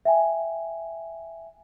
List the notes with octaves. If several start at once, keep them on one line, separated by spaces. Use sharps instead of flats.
E5 G5 G#5